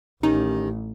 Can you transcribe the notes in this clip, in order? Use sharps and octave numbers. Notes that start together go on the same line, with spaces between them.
A1 D#3 C#4 D#4 G4